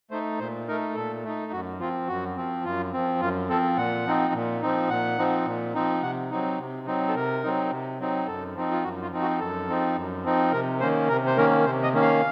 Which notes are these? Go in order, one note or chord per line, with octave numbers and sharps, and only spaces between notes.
A3 D#4 C5
A#2 C5
A3 D#4 A#4
A#2 A4
A3 D#4
F#2 F#4
F3 C4 F4
F#2 F#4
F3 C4
F#2 F4
F3 C4
F#2 F4
F3 C4 A4
A#2 F#5
F3 C4 D#4
A#2
F3 C4 D#4
A#2 F#5
F3 C4 D#4
A#2
F3 C4 D#4
C3 F#5
F#3 C4 D#4
C3
F#3 C4 D#4
A4
C3 A#4
F#3 C4 D#4
C3
F#3 C4 D#4
F#2 A4
F3 C4 D#4
F4
F#2 F#4
F4
F3 C4 D#4
F#4
F#2 A4
F3 C4 D#4
F#2
F3 C4 D#4
C3 A#4
D#3 A#3 C#4 C5
C3 A#4
C5
D#3 A#3 C#4 A#4
C3 C5
D#5
D#3 A#3 C#4
F5